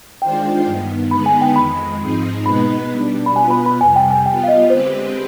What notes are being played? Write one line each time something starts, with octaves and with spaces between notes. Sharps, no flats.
D#3 G#3 D4 F4 C5 G5
G2 D#3 B3
D3 G#3 B3 D#4 B4 B5
G#5
G5
F2 D#3 G#3 B5
G#2 F3 C4 D#4 G#4
B2 G#3 B3 D#4 B4 B5
B2 G3 D4
B5
B2 B3 F4 B4 G#5
B5
B5
F2 C3 G3 G#5
G5
G#5
G3 B3 F4 G5
F5
D#5
D3 G#3 C4 G4 B4 C5